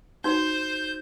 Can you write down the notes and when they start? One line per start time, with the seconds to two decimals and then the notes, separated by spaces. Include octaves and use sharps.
0.24 D#4 F#4 C5 G6